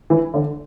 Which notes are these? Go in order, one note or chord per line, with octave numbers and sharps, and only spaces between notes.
E3
D3